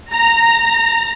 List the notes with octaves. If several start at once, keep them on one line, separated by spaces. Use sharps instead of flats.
A#5